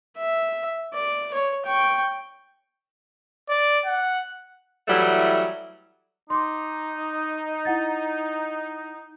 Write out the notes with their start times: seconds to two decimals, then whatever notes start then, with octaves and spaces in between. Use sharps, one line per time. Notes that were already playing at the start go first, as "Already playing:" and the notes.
0.17 E5
0.94 D5
1.34 C#5
1.65 G5 C#6
3.49 D5
3.86 F#5
4.87 E3 F#3 G3 A3 E4
6.30 D#4 C6 D6
7.65 E4 F#5 A6